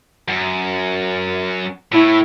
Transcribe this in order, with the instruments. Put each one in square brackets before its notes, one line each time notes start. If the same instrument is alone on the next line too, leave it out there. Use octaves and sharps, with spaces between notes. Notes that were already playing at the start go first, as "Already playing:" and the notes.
[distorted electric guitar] F#2
[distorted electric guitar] A2 [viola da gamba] E4